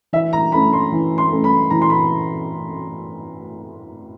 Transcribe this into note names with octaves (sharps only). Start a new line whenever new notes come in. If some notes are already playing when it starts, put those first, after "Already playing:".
E3 E5
A#5
A3 C#4 B5
C6
E3
C6
A3 C#4
B5
E3 A#5
C6
B5